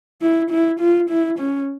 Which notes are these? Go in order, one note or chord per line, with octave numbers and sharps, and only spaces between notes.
E4
E4
F4
E4
C#4